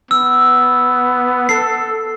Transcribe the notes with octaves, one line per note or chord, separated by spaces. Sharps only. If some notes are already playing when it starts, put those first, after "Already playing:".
B3 E6
A4 C7